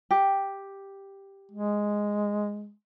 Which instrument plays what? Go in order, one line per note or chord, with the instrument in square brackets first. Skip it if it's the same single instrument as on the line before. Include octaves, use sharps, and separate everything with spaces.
[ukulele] G4
[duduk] G#3